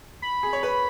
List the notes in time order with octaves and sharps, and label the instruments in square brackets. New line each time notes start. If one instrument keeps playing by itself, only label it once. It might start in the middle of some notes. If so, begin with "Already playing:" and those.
[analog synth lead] B5
[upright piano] G#4
C#5
B4